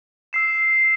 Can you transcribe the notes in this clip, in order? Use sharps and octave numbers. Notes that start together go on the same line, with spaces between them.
E6 C7 E7